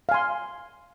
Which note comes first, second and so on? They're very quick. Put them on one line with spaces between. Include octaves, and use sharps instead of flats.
F5 G#5 C6